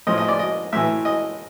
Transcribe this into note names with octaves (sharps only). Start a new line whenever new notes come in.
A2 F3 D#5
D#5
D5
D#5
A2 E3 E5
D#5